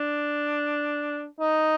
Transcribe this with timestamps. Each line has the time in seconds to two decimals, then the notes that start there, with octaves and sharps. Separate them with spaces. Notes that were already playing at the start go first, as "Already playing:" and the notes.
Already playing: D4
1.40 D#4